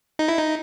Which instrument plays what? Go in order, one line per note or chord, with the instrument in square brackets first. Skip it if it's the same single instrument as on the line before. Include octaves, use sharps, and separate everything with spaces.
[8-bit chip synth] D#4
E4
D#4